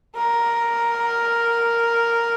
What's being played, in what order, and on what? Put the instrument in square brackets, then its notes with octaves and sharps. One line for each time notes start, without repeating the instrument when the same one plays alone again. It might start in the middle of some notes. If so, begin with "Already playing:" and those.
[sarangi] A#4